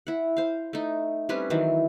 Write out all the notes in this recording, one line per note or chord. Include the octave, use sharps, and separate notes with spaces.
E4 F#5
C5 F5
A3 D#4
G3 C4 C#4 B4
D#3 E3 F#3 C4